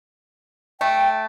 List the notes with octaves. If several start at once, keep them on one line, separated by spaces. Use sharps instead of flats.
A3 G5